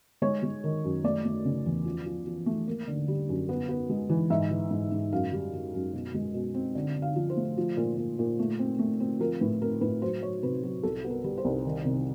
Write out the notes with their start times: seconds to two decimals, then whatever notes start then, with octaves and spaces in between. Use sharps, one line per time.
0.22 G#3 C#5
0.43 G#3
0.64 D#3
0.84 F#2
1.04 A3 D5
1.25 A3
1.45 C#3
1.66 E2
1.85 F3
2.06 F3
2.27 F3
2.46 A3
2.68 A#3
2.87 D3
3.08 G3
3.29 F#2
3.49 B3
3.69 B3
3.90 G#3
4.09 E3
4.30 G#2 E5
4.51 E3
4.71 G#2
4.92 G#2
5.12 F#2 F5
5.32 G3
5.54 G3
5.74 F#2
5.93 B2
6.14 G#3
6.34 B2
6.54 C4
6.75 D3
6.96 D3
7.02 F5
7.16 F3
7.30 C5
7.37 A3
7.58 F3
7.77 A#2
7.97 A#2
8.19 A#2
8.39 A3
8.59 C4
8.79 A3
9.00 C4
9.20 F3 A#4
9.41 A2 B4
9.62 C4 A#4
9.81 A2 B4
10.02 F#3 C5
10.22 F#3 C#5
10.42 C3 B4
10.64 F#3
10.83 C2 A4
11.04 B3
11.10 A#4
11.24 G3
11.38 C5
11.44 C2
11.65 D#3
11.85 C3